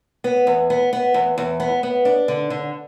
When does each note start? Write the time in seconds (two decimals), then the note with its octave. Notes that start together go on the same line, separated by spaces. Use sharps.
0.24 B3
0.47 E2
0.70 B3
0.93 B3
1.14 E2
1.38 E2
1.60 B3
1.83 B3
2.05 D4
2.28 D3
2.50 D3